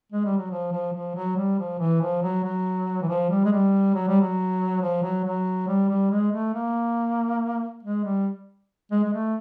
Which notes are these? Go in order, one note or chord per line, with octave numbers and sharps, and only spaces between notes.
G#3
G3
F#3
F3
F3
F3
F#3
G3
F3
E3
F3
F#3
F#3
E3
F3
G3
G#3
G3
F#3
G3
F#3
F3
F#3
F#3
G3
G3
G#3
A3
A#3
G#3
G3
G#3
G#3
A3